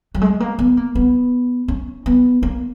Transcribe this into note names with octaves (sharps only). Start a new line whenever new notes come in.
F#3
G#3
A#3
B3
A#3
B3
C#4
B3
A#3